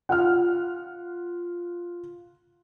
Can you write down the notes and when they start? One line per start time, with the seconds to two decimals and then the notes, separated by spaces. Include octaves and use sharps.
0.09 F4 F#5 F6